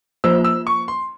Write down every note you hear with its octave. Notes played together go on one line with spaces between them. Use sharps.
F3 A#3 F4 C5 E6
E6
C#6
C6